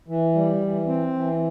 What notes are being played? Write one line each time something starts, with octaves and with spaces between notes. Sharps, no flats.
E3
G3
E3
C4
E3